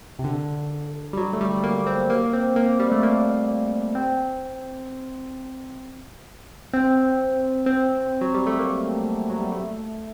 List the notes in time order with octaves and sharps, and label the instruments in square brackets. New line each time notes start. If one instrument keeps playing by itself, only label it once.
[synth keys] C3
D3
G3
F#3
A3
G3
A#3
C4
A#3
C4
A#3
G3
A3
A#3
C4
C4
C4
F#3
G3
A3
A#3
F#3
G3
A3